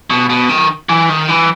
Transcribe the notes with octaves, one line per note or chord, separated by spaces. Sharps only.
B2
B2
D#3
E3
D#3
E3